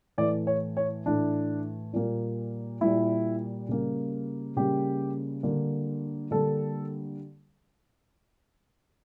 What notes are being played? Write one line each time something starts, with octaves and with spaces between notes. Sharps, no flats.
A2 E3 A3 D5
C#5
C#5
A2 E3 A3 D4
A#2 G3 A#3
A#2 G3 A#3 E4
C#3 G3 A#3
C#3 G3 A#3 G4
D3 G3 A#3
D3 G3 A#3 A4